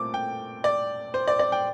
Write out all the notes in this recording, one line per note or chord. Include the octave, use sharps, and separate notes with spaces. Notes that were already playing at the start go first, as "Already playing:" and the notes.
Already playing: A#2 A3 C4 D6
G5
D5
C5
D5
D5
G5